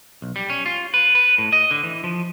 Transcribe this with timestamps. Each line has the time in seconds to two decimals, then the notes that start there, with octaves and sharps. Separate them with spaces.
0.22 B1
0.36 G3
0.50 C#4
0.66 F4
0.94 B4
1.15 B4
1.38 A2
1.52 D#5
1.71 D3
1.84 E3
2.04 F3